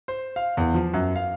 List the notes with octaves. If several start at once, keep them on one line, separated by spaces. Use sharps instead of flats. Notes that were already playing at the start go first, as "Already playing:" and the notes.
C5
F5
E2
F3
F#2
F5